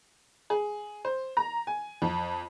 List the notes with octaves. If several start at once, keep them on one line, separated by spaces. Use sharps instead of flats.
G#4
C5
A#5
G#5
F2